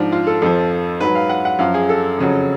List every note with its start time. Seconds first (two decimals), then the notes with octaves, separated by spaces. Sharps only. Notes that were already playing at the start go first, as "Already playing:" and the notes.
Already playing: G#2 F3 D4
0.12 F4
0.27 A4
0.42 F2 F3 A4
1.00 G#2 F#3 B4
1.15 F5
1.29 F#5
1.45 F#5
1.59 F#2 F3 F5
1.74 G#4
1.89 A4
2.18 F2 C#3 F#3